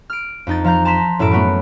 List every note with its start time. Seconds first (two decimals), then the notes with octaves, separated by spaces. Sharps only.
0.10 F6 D7
0.47 F2 D#4 A6
0.64 F3 F5 A#5 G6
0.85 A5 A#5 C6 A#6 B6 E7
1.19 F#2 A2 E4 A4 D7
1.31 F#3 A3 B3 F#4